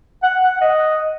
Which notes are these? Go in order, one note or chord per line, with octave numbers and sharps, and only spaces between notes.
F#5
F#5
D#5